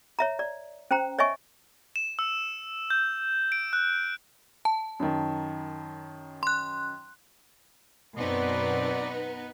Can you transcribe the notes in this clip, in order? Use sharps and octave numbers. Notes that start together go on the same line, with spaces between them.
C#5 E5 A#5
D5
C#4 C5 G5 A#5
C#5 D#5 E5 G#5 C#6
E7
E6
G6
D7
F#6
A5
F#2 D#3
C6 F#6
F#2 B2 B3 C4 D#4 B4 D5